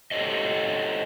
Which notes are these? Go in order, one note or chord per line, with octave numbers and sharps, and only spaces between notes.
G4 A4 C5 C#5 D#5